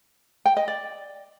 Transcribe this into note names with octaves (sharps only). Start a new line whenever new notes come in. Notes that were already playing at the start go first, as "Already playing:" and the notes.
G5
D#5
D5